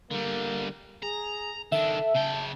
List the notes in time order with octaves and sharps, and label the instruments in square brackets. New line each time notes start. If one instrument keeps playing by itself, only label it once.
[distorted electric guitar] D3 G3 [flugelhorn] A#3
[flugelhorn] G#4 [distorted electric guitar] A#5
[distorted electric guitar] D#3 D4 [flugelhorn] A4 [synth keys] E5
[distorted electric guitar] C#3 G5 [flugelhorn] A5